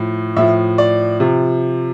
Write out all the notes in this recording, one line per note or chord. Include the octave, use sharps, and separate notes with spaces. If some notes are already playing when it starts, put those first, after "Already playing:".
Already playing: A2 F3
A2 F3 E5
D5
C3 F3